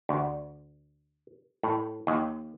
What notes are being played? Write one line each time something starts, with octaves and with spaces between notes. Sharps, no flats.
D2
A2
D#2